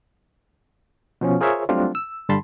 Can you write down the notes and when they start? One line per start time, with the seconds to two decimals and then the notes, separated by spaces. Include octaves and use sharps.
1.21 B2 F3 C#4
1.41 F4 G#4 A#4 C5 C#5 E5
1.69 F#3 G3 A3 C4 D4 F4
1.95 E6
2.29 G2 D3 G3 A5 B5 C6